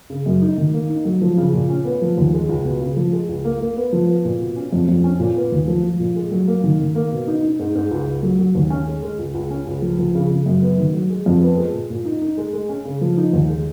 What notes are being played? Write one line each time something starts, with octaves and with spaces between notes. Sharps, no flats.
C#3
F#2
D#4
D#3
A#3
D#4
F#3
F3
C#3
A#2
C#4
B3
F3
D#2
G#3
C#2
B2
C#3
F3
G#3
C#2
A#3
A#3
B3
F3
B3
A#2
B2
C#4
F2
F2
C#4
A#2
B3
D#2
F3
F3
A#2
G#3
F#3
A#3
D#3
D#3
A#3
B2
D#4
D#4
G#2
G#2
C#2
C#2
F#3
F#3
D#2
C#4
G#3
G#3
C#2
C#2
C#4
C#2
F3
F3
C#3
C#3
F#2
B3
D#3
F#3
G#3
F2
B3
G#3
A#2
A#2
D#4
D#4
G#3
G#3
C#4
C#3
F3
D#4
D#2
G#3